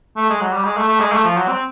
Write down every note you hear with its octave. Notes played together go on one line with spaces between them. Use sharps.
A3
G#3
F#3
G3
G#3
A3
A3
G#3
A3
F3
F#3
C4